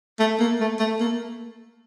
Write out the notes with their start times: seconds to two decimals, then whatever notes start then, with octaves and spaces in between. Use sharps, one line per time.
0.20 A3
0.40 A#3
0.60 A3
0.79 A3
1.00 A#3